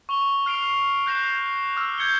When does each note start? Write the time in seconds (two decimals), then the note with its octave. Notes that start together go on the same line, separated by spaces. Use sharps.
0.09 C#6 F7 G7
0.46 F6 C7 D7 F7
1.06 F#6 G6 A#6 C7 E7 F7
1.76 D6 E6 F6
1.98 G6 G#6 C#7 G7